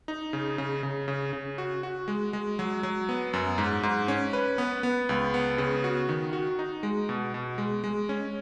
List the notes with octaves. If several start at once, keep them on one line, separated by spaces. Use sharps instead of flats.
D#4
C#3
C#3
C#3
C#3
C#3
F#4
F#4
G#3
G#3
F#3
F#3
B3
F#2
G#2
G#2
C#4
B4
B3
B3
C#2
B3
C#3
F#4
D#3
F#4
D#4
G#3
B2
B2
G#3
G#3
C#4